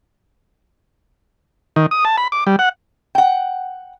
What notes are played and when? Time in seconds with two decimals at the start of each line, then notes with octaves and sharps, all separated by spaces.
1.76 D#3
1.91 D#6
2.05 A5
2.17 B5
2.32 D6
2.47 G3
2.59 F#5
3.15 F#5 G5